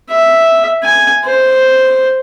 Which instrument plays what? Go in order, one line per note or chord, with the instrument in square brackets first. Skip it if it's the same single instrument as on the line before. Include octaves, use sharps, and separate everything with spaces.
[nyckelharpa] E5
G#5
C5